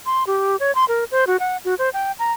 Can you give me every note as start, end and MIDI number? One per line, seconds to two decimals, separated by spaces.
0.06 0.24 84
0.27 0.56 67
0.60 0.74 73
0.75 0.85 84
0.88 1.04 70
1.11 1.25 72
1.27 1.37 66
1.40 1.57 78
1.65 1.75 66
1.79 1.90 72
1.94 2.12 79
2.19 2.32 82